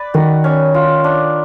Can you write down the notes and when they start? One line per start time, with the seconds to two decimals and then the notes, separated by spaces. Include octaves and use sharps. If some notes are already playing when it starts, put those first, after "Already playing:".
Already playing: B4 D5
0.14 D#3 F#4
0.44 C#4
0.74 F4
1.04 D4